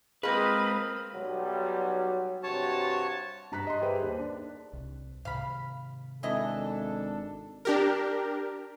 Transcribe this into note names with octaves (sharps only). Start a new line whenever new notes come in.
G#3 A#3 C4 F4 B4 D#6
B1 F#3 G3
G2 C3 F#4 C#5 A5
G2 A#5 F#6 B6
D#5 C6
G4 G#4 B4 C5 E5
D#2
D4
C2
G#2 C3 D#3 F5 B5
G#1 E3 D4 E4 A4 D#5
D4 G4 A#4